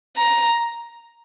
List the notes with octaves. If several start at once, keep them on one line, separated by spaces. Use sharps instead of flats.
A#5